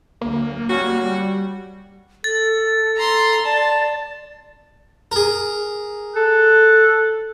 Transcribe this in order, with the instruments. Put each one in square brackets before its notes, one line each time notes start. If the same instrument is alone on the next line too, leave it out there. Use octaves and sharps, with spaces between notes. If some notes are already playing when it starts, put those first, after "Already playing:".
[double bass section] D2 F#3 [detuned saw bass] A#3
[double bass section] G3 C#4 [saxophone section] F#4
[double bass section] G3
[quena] A4 [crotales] A6
[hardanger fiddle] A#5 C6
[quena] D5 [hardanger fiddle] A5
[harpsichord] G#4 A#4
[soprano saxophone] A4 [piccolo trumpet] F#6